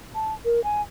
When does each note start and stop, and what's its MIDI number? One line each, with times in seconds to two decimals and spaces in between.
0.15 0.33 81
0.45 0.63 70
0.64 0.82 80